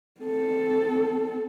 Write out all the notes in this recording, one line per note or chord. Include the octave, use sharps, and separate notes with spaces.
C4 A4